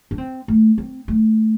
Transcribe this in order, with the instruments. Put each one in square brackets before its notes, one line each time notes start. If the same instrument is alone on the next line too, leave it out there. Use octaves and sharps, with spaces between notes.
[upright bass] D4
C4
A3
C4
A3